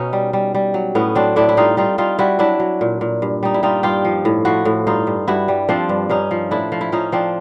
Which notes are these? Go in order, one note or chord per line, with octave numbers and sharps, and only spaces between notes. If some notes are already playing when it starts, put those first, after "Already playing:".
Already playing: B2 C#4 D#4
G3
G3
G3
F#3
A2 B3 C#4
F#3 C4 D4
A2 D4 E4
E4
G3 D#4 F4
G3 D#4 F4
G3 D#4 F4
G3 E4 F#4
F#3 D4 E4
F#3
A#2
A#2
G2
G3 D#4
E4
G3 D#4 F4
G2 F4 G4
F3
A2
F3 E4 F#4
A2
G2 D#4 F4
G2
G2 E4 F#4
G3
F3 C4 D4
G2
G2 C#4 D#4
F3
A2 D4 E4
F3
E4
F3 C#4 D#4
F3 C4 D4